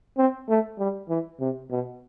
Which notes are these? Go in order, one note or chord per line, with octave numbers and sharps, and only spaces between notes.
C4
A3
G3
E3
C3
B2